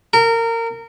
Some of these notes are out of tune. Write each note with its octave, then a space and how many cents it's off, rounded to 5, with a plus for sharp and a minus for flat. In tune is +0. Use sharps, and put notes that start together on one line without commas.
A#4 -25